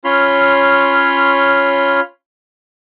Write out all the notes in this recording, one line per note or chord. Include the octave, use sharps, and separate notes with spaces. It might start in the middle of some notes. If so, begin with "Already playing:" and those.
C#4 F4 C#5 B5 C6 F6